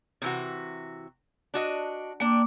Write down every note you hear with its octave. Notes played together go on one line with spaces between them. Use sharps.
C3 E3 F#4
D4 F#4 D#5
A#3 D4 G5 D6